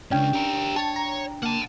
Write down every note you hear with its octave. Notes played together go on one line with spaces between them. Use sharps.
C#2 G2 C#4 D4 G5
G4 A#4
C#5 A5
A#5
A#3 F#5 A5